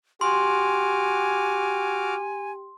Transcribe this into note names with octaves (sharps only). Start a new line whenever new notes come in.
F#4 G4 G#5 C6 D6 F6